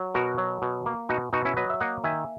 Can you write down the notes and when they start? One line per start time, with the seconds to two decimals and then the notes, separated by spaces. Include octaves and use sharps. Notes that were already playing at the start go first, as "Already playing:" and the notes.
Already playing: F#3
0.14 B2 F#4 A#4
0.38 F#3
0.62 B2
0.86 A#3
1.09 B2 D#4 F#4
1.33 B2 D#4 F#4
1.45 C#4 E4
1.57 F#3 B4 D#5
1.70 E5
1.80 A#3 D#5 F#5
2.04 D#3 E5 G#5